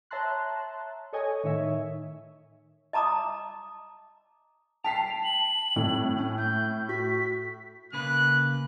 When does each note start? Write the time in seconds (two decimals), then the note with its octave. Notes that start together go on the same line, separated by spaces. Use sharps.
0.11 C#5 E5 A5 A#5 C6 F#6
1.13 A4 C#5 D#5 G#5
1.43 A2 D#3 C#5 E5
2.93 D#5 A5 A#5 D6 D#6
4.84 G5 A5 B6 C7 F7
5.24 F#7
5.76 A2 C4
6.18 C#4
6.38 A3 G6
6.89 F#4 B6
7.93 C#3 A#3 B4 F#6